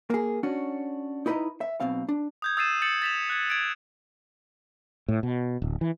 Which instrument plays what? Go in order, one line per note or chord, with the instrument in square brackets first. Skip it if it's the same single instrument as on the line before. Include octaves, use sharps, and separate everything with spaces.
[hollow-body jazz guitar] A#3 G#4
C#4 D4 F#4
D#4 E4 B4 C#5 D#5 A#5
E5
B1 B2 C4 F5
D4
[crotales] D#6 G6 G#6
D#6 E6 A6 C7 D#7 E7
G6 A6 C#7 E7 F#7
A6 B6 E7 F7
F#6 G#6
G#6 D7
[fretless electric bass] A2
B2
D1
E3